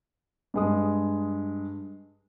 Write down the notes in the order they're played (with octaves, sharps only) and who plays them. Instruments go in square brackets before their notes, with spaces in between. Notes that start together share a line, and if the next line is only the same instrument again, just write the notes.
[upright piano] G2 G#3 D#6